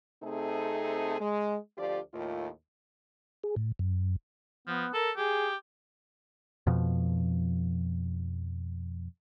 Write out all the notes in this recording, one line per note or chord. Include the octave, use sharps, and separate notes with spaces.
C3 A3 C4 D#4 G#4 A4
G#3
D2 F3 F4 G4 D5
D#2 A2 F4
G#4
A2
F#2
F3 B3
A4 A#4
G4 G#4
F2 B2 F3